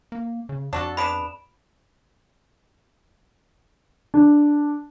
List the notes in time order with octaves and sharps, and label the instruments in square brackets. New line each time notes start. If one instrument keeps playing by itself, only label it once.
[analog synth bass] A#3
C#3
[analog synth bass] F2 [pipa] D4 F#4 A4
[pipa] G#3 B3 D4 [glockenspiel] B5 D7 E7
[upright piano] D4